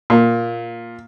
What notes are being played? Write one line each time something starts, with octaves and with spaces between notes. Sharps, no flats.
A#2